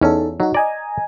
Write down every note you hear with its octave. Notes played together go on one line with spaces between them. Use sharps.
E2 C#4 D#4 A4
F#3 D#4 F#4
D5 D#5 G#5 A#5